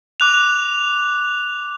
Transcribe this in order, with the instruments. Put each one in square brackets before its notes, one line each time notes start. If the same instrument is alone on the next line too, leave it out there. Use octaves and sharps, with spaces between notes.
[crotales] D6 F#6 F7